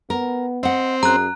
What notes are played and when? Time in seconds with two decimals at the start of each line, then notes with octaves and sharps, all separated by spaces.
0.10 B3 A#4
0.63 C4 D#5 F#5
1.03 F#2 G#4 A#5 F#6